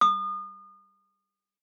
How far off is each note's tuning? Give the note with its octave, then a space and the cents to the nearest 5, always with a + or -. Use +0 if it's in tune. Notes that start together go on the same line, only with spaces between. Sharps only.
D#6 -35